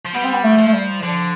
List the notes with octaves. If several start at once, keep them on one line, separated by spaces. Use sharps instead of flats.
F3
G3 B3
C4
B3
A3
F3
A3
G3
D3 F3